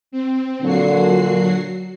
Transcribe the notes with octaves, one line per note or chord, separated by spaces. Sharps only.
C4
A#2 D3 F#3 F#4 C7